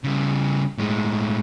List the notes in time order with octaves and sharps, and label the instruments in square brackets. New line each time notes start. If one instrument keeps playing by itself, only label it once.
[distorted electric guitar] C#3 G3
A2 G#3